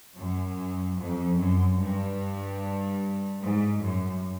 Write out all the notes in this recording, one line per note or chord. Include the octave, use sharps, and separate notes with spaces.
F#2
F2
F#2
G2
G#2
F#2